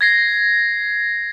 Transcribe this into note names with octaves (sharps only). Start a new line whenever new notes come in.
G#6 A#6 C7